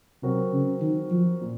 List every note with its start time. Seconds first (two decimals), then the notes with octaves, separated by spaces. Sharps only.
0.23 C3 F#3 C4 F#4 A#4
0.53 C#3
0.82 D#3
1.11 F3
1.41 A#2